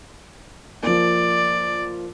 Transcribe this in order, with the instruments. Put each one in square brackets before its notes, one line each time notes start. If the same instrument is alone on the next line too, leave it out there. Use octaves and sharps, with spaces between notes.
[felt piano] F3 A#3 [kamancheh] D5